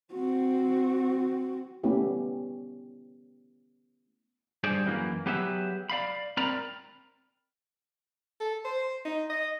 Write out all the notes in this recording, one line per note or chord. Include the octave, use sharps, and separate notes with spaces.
C4 F#4
A3 B3 C#4 E4 G4
G2 G#4 C5 D5
F#2 E3 A#3
F#3 B3 G4 G#4 B4 E5
D5 F5 B5
C4 A#4 D5 A#5 B5
A4
C5
D#4
D#5